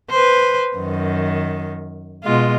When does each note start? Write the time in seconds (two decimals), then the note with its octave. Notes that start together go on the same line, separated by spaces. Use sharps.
0.10 B4 C5
0.77 F#2 D#3
2.24 B2 G#3 F4